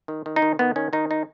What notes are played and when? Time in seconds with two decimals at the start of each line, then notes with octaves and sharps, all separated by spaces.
0.08 D#3
0.26 D#3
0.36 D#4
0.42 D#3
0.59 D#3 B3
0.76 D#3 C#4
0.93 D#3 D#4
1.11 D#4